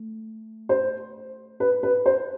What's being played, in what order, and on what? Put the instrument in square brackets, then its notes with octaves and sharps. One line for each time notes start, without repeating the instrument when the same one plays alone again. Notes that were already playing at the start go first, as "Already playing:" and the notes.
Already playing: [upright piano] A3
C5
B4
B4
C5